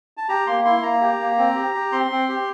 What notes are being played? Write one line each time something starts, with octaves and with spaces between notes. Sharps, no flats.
A5
G4 A#5
A#3 C6
E4 C6
A#3 A#5
G4
A#3
C4
G4
G4
C4 C6
C4
G4